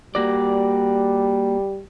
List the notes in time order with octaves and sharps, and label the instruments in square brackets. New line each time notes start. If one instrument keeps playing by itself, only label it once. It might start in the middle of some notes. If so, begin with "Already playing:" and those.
[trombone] G3 [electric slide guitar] A#3 F#4 D5